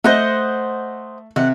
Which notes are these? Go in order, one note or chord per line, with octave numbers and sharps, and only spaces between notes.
A3 C5 D#5 F#5
C3 F#5